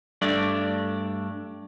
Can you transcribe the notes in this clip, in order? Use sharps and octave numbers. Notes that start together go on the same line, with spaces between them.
G2 A3 D4 D5